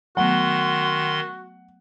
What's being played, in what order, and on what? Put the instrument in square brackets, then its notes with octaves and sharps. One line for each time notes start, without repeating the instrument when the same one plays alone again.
[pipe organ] D#3 C6 [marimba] F#3 A3 B3 [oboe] F#4 [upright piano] F#5